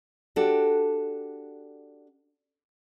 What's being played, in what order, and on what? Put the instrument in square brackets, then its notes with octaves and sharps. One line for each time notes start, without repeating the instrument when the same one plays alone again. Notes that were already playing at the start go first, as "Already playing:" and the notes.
[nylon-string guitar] D4 F#4 G4 A4